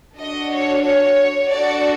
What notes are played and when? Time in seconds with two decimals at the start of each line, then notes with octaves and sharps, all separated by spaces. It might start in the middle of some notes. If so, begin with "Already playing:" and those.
0.19 D4 F#4 A4 D#5
0.52 C#5
0.85 C#5
1.50 D4 F#4 A4 D5